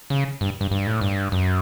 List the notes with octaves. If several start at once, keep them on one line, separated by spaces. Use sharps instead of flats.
C#3
G2
G2
G2
A2
G2
F#2